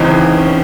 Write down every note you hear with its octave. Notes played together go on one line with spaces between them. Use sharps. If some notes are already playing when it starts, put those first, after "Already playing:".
Already playing: C#2 C#3 E3 C4 D#4
C#4